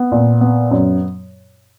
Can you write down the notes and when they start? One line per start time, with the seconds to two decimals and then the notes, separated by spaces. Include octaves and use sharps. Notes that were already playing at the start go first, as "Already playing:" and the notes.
Already playing: B3
0.12 A#2
0.41 B3
0.71 F#2